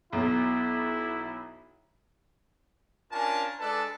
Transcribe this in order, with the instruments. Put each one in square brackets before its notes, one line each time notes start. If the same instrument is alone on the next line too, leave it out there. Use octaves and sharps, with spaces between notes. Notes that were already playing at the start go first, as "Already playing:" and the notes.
[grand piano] B1 B2 [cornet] E4
[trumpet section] C#4 D4 F4 A#4 G#5 A5
G#3 D4 A4 B4 D5 A5